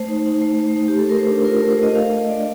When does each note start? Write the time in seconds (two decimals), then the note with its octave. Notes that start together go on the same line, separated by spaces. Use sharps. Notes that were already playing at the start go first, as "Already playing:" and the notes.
Already playing: A3 C5
0.08 D#4
0.26 D#4
0.42 A3
0.60 A3
0.76 D#4
0.88 G4
0.93 A3
0.99 A4
1.09 A3 A#4
1.19 C5
1.28 D4
1.45 F4 A#4
1.57 A#4
1.62 A3
1.70 C5
1.79 A3 D#5
1.95 A3 F5
2.12 A3 D#5
2.29 D4 D5